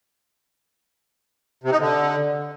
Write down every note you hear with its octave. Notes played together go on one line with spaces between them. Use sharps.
C3
D#4
D3